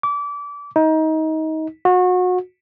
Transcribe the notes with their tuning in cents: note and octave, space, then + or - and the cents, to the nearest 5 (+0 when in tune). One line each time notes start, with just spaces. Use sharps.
D6 -25
D#4 +25
F#4 -30